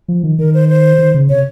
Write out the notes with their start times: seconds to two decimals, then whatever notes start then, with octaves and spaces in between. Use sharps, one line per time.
0.08 F3
0.23 D#3
0.39 D#3 A#4
0.54 C5
0.69 C5
0.99 D#3
1.14 C#3
1.29 C3 C#5